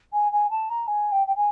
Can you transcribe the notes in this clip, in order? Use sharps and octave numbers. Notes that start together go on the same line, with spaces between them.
G#5
G#5
A5
A#5
G#5
G5
G5
G#5